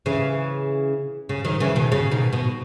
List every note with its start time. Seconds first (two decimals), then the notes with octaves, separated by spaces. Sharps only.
0.06 C#3 E3
1.29 C#3
1.45 D#3 F#3
1.60 C#3 E3
1.76 B2 D#3
1.92 C#3
2.11 B2 D#3
2.33 B2